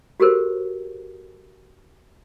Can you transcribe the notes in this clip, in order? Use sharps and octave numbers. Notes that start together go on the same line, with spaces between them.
F#4 G4 A4 A#4 C5